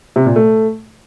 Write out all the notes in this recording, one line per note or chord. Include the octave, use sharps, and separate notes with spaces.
C3
A#2
A3